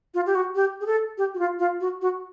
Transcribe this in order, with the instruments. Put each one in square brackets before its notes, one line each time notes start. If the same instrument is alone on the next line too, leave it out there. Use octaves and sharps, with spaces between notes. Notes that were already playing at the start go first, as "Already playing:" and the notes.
[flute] F4
G4
F#4
G4
G#4
A4
G4
F#4
F4
F4
F#4
F#4